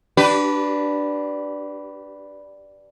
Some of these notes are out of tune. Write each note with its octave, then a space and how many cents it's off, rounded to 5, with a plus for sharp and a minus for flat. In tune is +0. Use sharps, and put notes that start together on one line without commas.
D4 +0 G4 -35 B4 +0